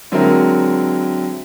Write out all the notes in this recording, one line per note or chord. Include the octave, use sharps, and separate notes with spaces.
D3 F#3 G#3 C4 E4 A#4